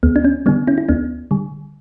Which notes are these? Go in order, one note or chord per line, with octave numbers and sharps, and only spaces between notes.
D2 B3
D4
C#4
D3 G3 B3 D4
C#4 E4
E4
D2 B3 D4
D3 G3